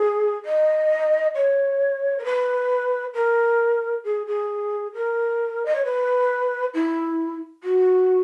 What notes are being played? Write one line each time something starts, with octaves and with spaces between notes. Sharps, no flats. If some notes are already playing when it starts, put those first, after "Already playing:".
Already playing: G#4
D#5
C#5
A#4
B4
A#4
G#4
G#4
A#4
D#5
C#5
B4
E4
F#4